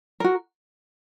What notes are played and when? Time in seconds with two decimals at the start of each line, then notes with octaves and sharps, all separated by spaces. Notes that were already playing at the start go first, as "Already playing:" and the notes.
0.20 F#4 A#4